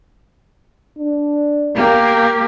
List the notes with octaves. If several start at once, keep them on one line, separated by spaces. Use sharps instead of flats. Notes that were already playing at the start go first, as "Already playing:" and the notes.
D4
A#3 G4